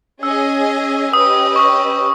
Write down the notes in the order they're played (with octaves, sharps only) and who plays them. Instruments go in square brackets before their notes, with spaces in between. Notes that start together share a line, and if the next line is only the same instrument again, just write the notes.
[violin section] C#4 G#4 D#5 G#5 [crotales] E6
[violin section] C#4 G4 B4 D#5 [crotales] D#6
[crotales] C#6
D#6